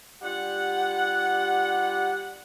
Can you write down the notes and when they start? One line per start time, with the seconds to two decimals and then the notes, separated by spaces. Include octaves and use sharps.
0.22 G3 D4 F4 G4 F#5